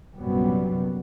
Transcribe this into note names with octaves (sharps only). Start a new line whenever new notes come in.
A#1 F#2 C3 F#3 G3 B3